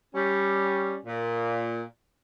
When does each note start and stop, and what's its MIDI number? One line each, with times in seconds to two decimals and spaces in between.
0.14 0.96 55
0.14 0.96 61
1.05 1.81 46